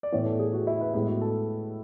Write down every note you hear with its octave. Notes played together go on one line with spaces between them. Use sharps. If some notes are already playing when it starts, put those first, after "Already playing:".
D5
A2 E3 B3 C#5
A4
G#4
F#4
E4
B4
A2 G#3 B3 E4
F#4
A4